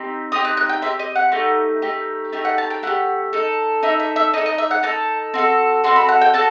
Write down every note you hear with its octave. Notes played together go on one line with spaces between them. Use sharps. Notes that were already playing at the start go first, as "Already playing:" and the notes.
Already playing: C4 D#4 G4
C4 D#4 G4 D#6
F#6
F#6
G5
C4 D#4 G4 E5
D#5
F#5
A3 D#4 G4
A3 D#4 G4
A3 D#4 G4 E5
F#5
A5
G5
A3 D#4 G4 F#5
D#4 A4
D#4 A4 E5
E5
E5
D#4 A4 D#5
D#5
E5
F#5
D#4 A4 A5
C4 F#4 A4
C4 F#4 A4 C6
B5
F#5
G5
F#4 A4 A5